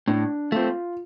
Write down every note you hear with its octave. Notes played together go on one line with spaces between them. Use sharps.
A2 D4
A3 C4 F4